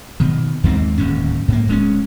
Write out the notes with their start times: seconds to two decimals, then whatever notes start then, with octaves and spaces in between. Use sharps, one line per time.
0.20 B2 D#3
0.64 D#2 G#2 B3 C4
0.98 D1 D#2 G#2 C#4
1.48 G#2 A#3
1.68 D1 G#3 C4 C#4